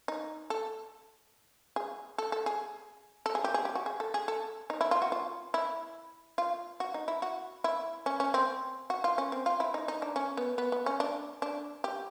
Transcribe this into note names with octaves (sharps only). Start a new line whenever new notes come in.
D#4
A4
G#4
A4
A4
G#4
A4
G#4
G4
G#4
G4
F#4
G#4
A4
G#4
A4
D#4
E4
F4
F#4
F4
E4
F4
F#4
D#4
E4
F#4
E4
C#4
C#4
C4
F#4
F4
C#4
C4
F4
E4
D#4
D#4
D4
C#4
B3
B3
B3
C#4
D4
D4
G4